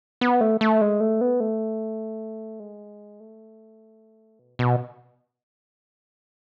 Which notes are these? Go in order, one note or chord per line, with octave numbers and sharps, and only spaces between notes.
B3
A3
A3
G#3
A3
B3
A3
G#3
A3
B2
B2